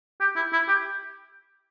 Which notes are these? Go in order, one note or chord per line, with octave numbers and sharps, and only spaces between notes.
G4
E4
E4
G4